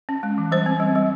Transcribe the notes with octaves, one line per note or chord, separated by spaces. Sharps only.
C#4
G#3
E3
G3 C5
C4
G3
G3